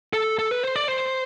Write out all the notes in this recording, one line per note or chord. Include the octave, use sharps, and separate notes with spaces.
A4
A4
B4
C5
D5
C5